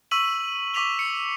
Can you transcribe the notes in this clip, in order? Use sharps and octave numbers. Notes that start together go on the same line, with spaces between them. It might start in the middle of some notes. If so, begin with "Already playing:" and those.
C#6 E6 B6 D#7 F#7
C#6 D6 B6 D#7 F7 G7
C#7